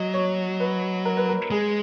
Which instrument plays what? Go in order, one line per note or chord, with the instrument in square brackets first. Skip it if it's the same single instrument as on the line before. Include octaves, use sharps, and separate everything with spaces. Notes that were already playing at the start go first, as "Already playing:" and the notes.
Already playing: [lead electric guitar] F#3 [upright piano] D#5
[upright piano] C#5
B4
A#4
B4
A#4
[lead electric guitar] G#3 [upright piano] G#4